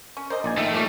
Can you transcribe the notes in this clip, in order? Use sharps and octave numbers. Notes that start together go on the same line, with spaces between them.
C#4
A#4 C5 D5 D#5
A#1 D#4 D5 G#5
A2 D#3 A3 D#5 E5
A#2 G3 A3 G4 C#5